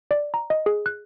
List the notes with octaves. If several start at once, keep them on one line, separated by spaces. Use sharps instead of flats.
D5
A#5
D#5
G#4
F#6